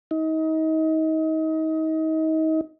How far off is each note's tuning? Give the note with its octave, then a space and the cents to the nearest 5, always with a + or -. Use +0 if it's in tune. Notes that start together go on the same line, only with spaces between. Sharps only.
D#4 +30